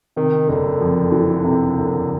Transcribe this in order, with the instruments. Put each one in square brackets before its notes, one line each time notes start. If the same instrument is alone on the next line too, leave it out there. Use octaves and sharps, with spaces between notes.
[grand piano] C3 [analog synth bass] D#3
[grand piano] F#1 [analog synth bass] D3
[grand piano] F2
E3
C3
F#1